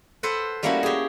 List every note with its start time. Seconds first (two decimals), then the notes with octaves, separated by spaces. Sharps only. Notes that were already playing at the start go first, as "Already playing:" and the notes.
0.23 A4 B4 C5 F#5
0.63 G3 A3 A#3 C#4 E4 F#4
0.83 G4 G#4